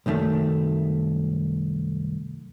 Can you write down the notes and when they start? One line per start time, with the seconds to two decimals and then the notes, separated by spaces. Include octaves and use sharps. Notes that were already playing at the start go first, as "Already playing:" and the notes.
0.06 C2 F#2 D#3 A3